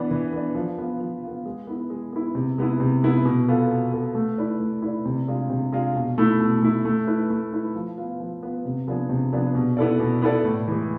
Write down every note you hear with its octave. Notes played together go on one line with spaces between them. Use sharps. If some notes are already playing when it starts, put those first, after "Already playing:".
Already playing: E3 B3 D4
E3
B3 D4
F3
B3 F4
F3
B3 F4
G#3
B3 E4
G#3
B3 E4
C3
G#3 B3 E4
C3
G#3 B3 E4
B2
B3 F4 A4
B2
B3 F4 A4
A3
E4 B4 D5
A3
E4 B4 D5
C3
G#3 D4 F4
C3
G#3 D4 F4
B2
A3 E4
B2
A3 E4
A3
E4 B4
A3
E4 B4
F3
B3 F4 B4
F3
B3 F4 B4
C3
F3 B3 D4 G#4
C3
F3 B3 D4 G#4
B2
B3 E4 A4 D5
B2
B3 E4 A4 D5
A2
E3 G#3